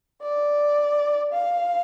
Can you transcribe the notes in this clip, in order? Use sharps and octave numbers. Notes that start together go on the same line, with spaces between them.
D5
F5